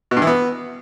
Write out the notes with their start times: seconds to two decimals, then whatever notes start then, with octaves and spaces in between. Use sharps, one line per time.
0.11 B2
0.17 G2
0.22 E3
0.27 B3